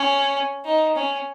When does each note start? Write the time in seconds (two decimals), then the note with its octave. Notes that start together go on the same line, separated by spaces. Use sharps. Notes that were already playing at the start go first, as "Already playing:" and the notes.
Already playing: C#4
0.65 D#4
0.95 C#4